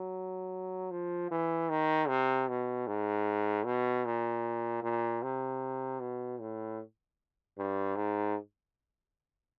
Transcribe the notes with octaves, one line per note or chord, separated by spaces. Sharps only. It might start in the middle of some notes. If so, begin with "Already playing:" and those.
Already playing: F#3
F3
E3
D#3
C3
B2
G#2
B2
A#2
A#2
C3
B2
A2
G2
G#2